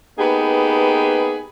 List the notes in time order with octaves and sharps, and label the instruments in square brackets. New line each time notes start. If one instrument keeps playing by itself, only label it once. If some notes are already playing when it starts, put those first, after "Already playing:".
[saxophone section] A#3 B3 D#4 G4 G#4 B4